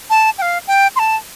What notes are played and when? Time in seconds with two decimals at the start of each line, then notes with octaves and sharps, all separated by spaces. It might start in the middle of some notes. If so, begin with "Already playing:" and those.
0.10 A5
0.38 G5
0.42 F5
0.67 G5
0.96 C6
0.99 A5